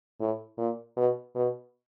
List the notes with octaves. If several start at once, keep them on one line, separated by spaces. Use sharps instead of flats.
A2
A#2
B2
B2